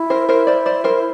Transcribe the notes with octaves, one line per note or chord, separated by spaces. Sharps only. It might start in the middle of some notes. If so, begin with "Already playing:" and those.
Already playing: E4
A#4 C5
A#4 C5
C5 D5
C5 D5
A#4 C5